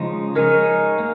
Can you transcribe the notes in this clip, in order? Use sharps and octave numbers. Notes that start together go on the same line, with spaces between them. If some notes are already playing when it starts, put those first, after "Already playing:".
Already playing: C#3 F3 G#3 D#4
G#3 D#4 G#4 A#4 C#5
A#3